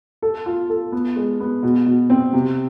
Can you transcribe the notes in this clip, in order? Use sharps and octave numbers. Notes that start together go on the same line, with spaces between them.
A4
F4
A4
B3
G#3
B3
B2
B2
C4
C3